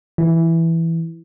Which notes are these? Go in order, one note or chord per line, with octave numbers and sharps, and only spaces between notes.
E3